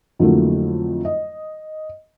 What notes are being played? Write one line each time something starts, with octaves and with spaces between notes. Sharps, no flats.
F2 D3 F#3 A3 A#3 E4
D#5